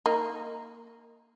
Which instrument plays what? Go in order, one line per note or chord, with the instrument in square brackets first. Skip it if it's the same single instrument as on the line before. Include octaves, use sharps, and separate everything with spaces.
[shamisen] A#3 D#4